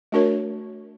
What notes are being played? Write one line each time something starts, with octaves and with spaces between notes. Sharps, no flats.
A3 D4 F#4 A#4 C#5